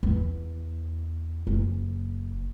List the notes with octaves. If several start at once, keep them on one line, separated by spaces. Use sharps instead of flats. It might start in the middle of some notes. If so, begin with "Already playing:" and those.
E2
F#1